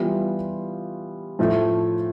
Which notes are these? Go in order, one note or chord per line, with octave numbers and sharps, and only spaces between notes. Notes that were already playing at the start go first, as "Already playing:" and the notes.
Already playing: E3 G3 B3 F4
A2 F3 A3